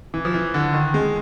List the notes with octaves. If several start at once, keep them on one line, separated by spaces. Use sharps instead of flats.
E3
F3
E3
D3
D#3
G#3